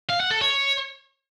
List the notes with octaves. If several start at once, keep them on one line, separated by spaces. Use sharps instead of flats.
F5
F#5
A4
C#5